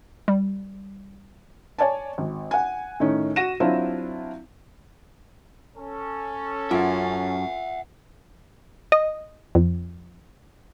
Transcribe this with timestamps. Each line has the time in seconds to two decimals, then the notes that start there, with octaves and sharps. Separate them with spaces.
0.28 G3
1.78 C#5 D5 G#5 A5
2.18 G#1
2.51 F#5 G#5
3.00 A2 D#3 C#4
3.36 F#4 A#6 D#7 E7
3.60 F#3 C4 D4 E4 F4
5.77 C#4 A4
6.71 F#2 F4 E5 F#5
8.92 D#5
9.55 F2